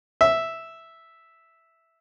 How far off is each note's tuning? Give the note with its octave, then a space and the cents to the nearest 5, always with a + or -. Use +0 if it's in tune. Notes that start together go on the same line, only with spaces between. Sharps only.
E5 -5